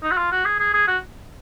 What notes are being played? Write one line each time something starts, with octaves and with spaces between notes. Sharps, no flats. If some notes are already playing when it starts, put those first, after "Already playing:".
D#4
F#4
F4
F#4
G#4
G#4
G#4
F#4